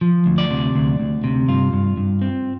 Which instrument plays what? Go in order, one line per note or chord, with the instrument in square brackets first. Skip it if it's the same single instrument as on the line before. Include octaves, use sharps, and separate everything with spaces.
[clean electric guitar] F3
D2
D5
C3
D2
D2
C3
G2 F4
G2
G2
C4